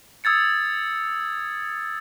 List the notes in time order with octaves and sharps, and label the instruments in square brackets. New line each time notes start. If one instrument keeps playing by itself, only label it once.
[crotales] D#6 E6 G#6 A6 C#7